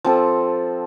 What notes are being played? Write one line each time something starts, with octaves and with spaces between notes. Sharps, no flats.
F3 C4 A4